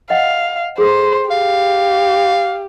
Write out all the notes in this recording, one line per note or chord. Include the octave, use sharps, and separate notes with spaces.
D#5 F5 F#5
G#4 A4 C5
G4 F5